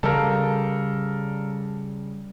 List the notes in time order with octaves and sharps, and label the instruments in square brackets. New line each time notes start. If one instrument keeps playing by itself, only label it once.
[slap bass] C#3 G3 [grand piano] A4 A#4 F5